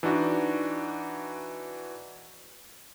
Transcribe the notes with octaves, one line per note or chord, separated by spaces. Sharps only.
E3 D4 D#4 F#4